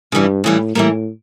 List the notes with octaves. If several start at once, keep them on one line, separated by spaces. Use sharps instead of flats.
G2 C#3 E3 G3
A2 C#3 E3 G3
A2 E3 G3 A#3